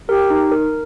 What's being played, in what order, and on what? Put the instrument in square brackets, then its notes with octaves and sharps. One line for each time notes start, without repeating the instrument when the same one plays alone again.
[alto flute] G4 [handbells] A#4
[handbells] D#4
A#4